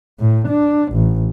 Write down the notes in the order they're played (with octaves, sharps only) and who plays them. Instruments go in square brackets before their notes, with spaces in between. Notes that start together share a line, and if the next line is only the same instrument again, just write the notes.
[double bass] A2
D4
A1